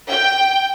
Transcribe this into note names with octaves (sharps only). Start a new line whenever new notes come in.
G5